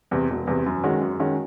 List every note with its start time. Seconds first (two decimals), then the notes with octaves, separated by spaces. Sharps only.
0.11 E2 C3
0.30 E1
0.47 E2 C3
0.66 F#2
0.84 D#3 G#3 C#4 F#4
1.01 F#2
1.20 D#3 G#3 C#4 F#4